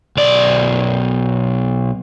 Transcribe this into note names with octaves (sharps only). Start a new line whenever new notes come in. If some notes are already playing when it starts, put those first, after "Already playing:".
B1 D5